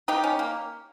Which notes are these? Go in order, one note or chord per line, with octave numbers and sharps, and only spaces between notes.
D#3 D#4 G4
C#4
A#3